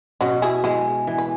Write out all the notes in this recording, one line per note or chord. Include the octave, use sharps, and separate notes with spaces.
B2 C#4 F#4
E4 G#4
G#3 E4 G#4
E3
B4